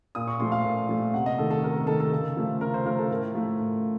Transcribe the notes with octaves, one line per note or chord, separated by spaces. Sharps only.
A#2 D#6
C#6
F3 A3 C6
F5
A#2
F3 A3
C3 F#5
D#5
D#3 A3 A4
A4
C3 A#4
A#4
D#3 A3 A4
A4
C#3 A4
F3 A3
C#3 A#4
C5
F3 A3 A#4
A4
A2 A#4
F3 A3
A2